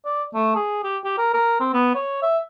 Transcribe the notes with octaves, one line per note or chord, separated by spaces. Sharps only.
D5
A3
G#4
G4
G4
A#4
A#4
C4
B3
C#5
E5